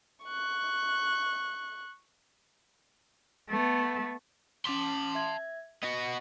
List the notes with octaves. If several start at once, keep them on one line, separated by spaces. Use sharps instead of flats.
C#6 F#6
A3 B3
C#4 A5 C6 D6 B6
E5 G#6
B3 F#4 D#5